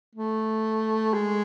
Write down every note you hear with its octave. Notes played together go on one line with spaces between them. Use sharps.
A3
G#3